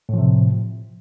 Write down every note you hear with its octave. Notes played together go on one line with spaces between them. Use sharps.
A2 C3 F3